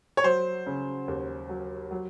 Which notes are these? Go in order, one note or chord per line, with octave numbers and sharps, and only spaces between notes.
C#5
F#3 C5
C#3
D#2
F#3
F#3